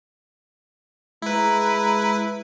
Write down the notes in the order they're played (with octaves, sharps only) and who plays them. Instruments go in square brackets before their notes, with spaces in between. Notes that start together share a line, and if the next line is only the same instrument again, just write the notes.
[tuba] G#3 [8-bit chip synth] E4 B4 [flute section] A#5